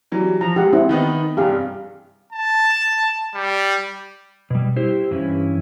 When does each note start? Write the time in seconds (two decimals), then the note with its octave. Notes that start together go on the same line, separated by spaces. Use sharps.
0.12 E3 F#3 G3
0.41 F3 A#5
0.56 G#3 G4 F#5
0.73 C4 E4
0.89 D#3 B3 D#4
1.37 G2 C3 G3 G4 G#4 F5
2.33 A5
3.34 G3
4.50 B2 G3
4.76 E4 G4 C5
5.11 G2 E3 C#4 E4